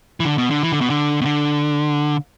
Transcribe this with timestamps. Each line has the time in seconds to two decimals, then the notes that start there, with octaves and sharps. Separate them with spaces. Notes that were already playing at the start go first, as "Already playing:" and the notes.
0.20 E3
0.25 D3
0.38 B2
0.51 D3
0.63 E3
0.72 D3
0.81 B2
0.90 D3
1.21 B2
1.25 D3